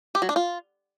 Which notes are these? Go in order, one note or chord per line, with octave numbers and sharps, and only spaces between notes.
G4
F#3
D4
F4